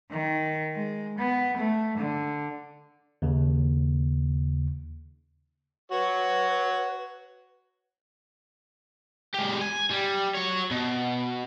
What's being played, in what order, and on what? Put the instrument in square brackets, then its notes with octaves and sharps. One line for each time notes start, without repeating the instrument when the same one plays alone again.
[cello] D#3
G#3
B3
A3
D3
[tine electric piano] D#2 C#3
[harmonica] F#4 C#5 [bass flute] B4
[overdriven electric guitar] G#3 G4
G#5
G3
F#4 C#5
B2